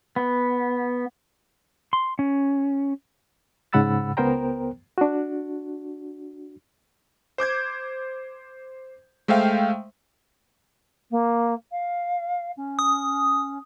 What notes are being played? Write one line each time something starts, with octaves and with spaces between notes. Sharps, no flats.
B3
C6
C#4
G#2 C#3 F#5 B5 E6 A6
C#2 B3 A#4 C5 G5 A#5
D4 F#4
C5 D6 G6 G#6
G#3 A3 C5 E5 F5 G5
A#3
F5
C#4
D#6